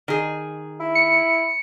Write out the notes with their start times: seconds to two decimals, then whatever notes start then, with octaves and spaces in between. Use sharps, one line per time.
0.08 D#3 G#4
0.80 E4
0.95 C#7